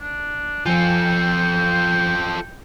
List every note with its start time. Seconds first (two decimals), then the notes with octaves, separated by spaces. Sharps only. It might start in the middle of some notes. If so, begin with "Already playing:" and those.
0.01 D4
0.66 F3 F4 A4 G5 G#5